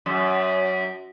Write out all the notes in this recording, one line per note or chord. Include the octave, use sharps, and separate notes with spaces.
F#2